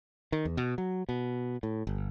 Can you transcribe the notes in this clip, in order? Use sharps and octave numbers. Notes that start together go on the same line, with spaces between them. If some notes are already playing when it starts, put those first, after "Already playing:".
D#3
E2
B2
F#3
B2
A2
G1